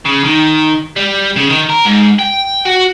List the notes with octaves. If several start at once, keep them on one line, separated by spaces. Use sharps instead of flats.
C#3
D#3
G3
C#3
D#3
A#4
G#2
G5
F#4